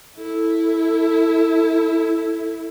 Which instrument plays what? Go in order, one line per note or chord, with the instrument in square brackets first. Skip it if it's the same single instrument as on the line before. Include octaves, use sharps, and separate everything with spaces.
[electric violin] E4 [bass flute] A4